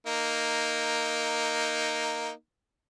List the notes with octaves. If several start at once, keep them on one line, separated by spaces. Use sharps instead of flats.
A#3 D#4